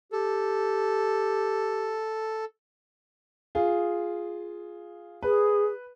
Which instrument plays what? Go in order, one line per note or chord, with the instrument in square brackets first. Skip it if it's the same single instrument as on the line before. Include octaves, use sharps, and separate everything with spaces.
[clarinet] G4 [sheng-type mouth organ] A4
[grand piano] F4 G#4
[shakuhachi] G#4 [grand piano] B4